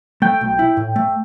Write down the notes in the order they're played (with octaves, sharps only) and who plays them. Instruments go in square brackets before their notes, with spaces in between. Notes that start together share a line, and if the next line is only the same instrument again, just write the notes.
[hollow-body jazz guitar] A3 [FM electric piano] G5
[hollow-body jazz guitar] B1
E4
A2
A3